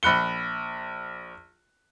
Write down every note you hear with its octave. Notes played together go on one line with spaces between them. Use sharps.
A#1 B5 F#6 C#7 G7